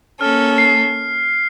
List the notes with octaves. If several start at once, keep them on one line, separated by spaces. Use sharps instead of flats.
A#3 C#4 A4 F6
C7